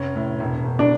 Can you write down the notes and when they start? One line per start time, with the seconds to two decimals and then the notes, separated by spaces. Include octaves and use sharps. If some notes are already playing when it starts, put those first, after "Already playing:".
Already playing: F1 C#4
0.16 A2
0.40 E1
0.65 E1
0.79 D4